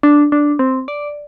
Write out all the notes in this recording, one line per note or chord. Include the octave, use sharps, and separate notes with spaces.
D4
D4
C4
D5